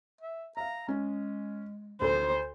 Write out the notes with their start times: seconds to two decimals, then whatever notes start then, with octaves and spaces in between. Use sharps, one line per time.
0.21 E5
0.57 E5 F5 A#5
0.88 G#3 C#4
2.01 D2 A4 C5